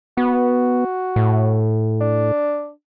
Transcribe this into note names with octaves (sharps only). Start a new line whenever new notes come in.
B3 F#4
A2
D4